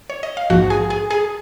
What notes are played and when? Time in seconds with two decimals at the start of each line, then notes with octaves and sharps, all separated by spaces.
0.10 C#5
0.23 D#5
0.37 F5
0.50 A#1 G#2 F3 F#4 F#5
0.70 G#4 G#5
0.90 G#4 G#5
1.10 G#4 G#5